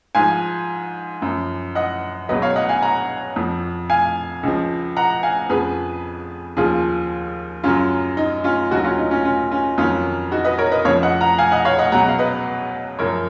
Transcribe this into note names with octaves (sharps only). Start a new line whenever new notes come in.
G#2 F3 F5 G#5
F#2 F3
D#5 F#5
C#2 B2 F#3 B4 D#5
C#5 F5
D#5 F#5
F5 G#5
F#5 A#5
F2 F3
F5 G#5
C#2 C#3 F3
F#5 A#5
F5 G#5
F2 C#3 F3 G#4 B4
D#2 C#3 F3 F4 G#4
F#2 C#3 F#3 C#4 F4
D#4
C#4 F4
D#2 C#3 F#3 D#4 F#4
C#4 F4
D#4
C#4 F4
C#4 F4
C#4 F4
F2 D#3 F#3 C#4 F4
D#4 F#4
B4 D#5
A#4 C#5
B4 D#5
F2 C#3 F3 C#5 F5
D#5 F#5
F#5 A#5
F5 G#5
D#5 F#5
C#5 F5
D#5 F#5
C#2 B2 F#3 F#5 A#5
F5
B4 D#5
F#2 C#3 F3 A#4 C#5